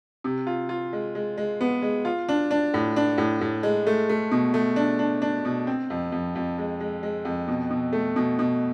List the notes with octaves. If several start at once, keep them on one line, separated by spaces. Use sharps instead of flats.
C3
F4
F4
G#3
G#3
G#3
B3
G#3
F4
D4
D4
A2
D4
A2
A2
G#3
A3
A3
B2
A3
D4
D4
D4
B2
C4
F2
F2
F2
G#3
G#3
G#3
F2
B2
B2
A3
B2
B2